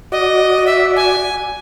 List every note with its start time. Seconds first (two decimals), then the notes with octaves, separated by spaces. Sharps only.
0.12 F#4 D5 D#5
0.66 E5
0.96 G#5